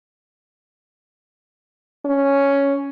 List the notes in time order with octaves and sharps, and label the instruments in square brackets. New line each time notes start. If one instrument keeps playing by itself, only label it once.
[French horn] C#4